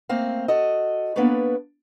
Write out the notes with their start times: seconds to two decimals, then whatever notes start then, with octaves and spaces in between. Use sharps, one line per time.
0.09 A3 A#3 C4 F5
0.48 F#4 A4 D#5
1.16 A#3 B3 D4 A4 B4 C#5